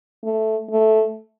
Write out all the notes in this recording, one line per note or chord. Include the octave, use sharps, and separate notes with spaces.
A3
A3